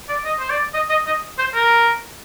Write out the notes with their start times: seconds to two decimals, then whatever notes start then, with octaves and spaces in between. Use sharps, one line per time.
0.09 D5
0.25 D#5
0.40 C5
0.50 D5
0.74 D#5
0.89 D#5
1.07 D#5
1.39 C5
1.54 A#4